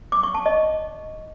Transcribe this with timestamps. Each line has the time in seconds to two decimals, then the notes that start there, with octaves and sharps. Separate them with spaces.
0.12 D6
0.23 C#6
0.35 A5
0.46 D#5